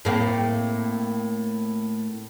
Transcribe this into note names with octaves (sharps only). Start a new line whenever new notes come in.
A2 A#3 C4